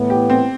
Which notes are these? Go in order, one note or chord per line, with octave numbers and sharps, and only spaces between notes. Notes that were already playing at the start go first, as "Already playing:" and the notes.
Already playing: A2 E3 B3
G4
C4